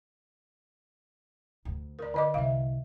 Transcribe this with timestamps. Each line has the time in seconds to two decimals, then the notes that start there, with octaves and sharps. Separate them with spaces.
1.65 D2
1.99 A#4 D5
2.14 D3 D#5 D6
2.34 C2 E5 F5